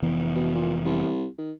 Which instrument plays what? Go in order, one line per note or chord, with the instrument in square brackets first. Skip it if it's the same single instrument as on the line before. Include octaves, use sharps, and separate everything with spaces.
[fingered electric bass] F1 E3 B3
[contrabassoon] B2
A#2
C2
D#3